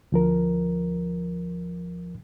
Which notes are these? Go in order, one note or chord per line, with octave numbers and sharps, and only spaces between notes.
D2 F3 A#4